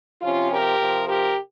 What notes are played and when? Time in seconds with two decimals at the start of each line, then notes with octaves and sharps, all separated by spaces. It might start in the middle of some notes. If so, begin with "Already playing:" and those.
0.22 C3 F3 C#4 F4
0.51 G4 A#4
0.80 C3 F3
1.07 G4 A#4